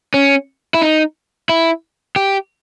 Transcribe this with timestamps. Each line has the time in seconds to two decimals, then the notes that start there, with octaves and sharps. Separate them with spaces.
0.14 C#4
0.74 E4
0.82 D#4
1.49 E4
2.16 G4